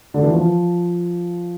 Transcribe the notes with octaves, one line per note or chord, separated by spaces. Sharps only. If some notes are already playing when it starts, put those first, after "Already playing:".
D3
E3
F3